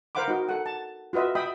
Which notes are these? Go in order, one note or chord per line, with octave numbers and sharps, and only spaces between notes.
A#4 C5 F5 F#5 B5 D6
D#4 F#4
A4 F#5
A5
F4 F#4 B4 D#5 E5
D#5 E5 G5 B5 D#6